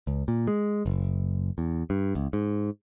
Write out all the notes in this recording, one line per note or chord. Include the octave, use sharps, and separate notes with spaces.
C#2
A#2
G#3
F#1
E2
G2
C#2
G#2